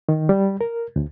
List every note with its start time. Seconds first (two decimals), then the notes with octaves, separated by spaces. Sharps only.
0.09 D#3
0.29 G3
0.61 A#4
0.96 D2